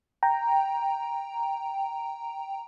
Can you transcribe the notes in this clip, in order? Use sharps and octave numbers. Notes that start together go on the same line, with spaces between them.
G5 A#5